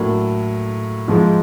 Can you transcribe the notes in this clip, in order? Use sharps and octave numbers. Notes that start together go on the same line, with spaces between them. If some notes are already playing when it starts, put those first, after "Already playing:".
Already playing: A2 F#3 A#3 D4
G#2 F3 G#3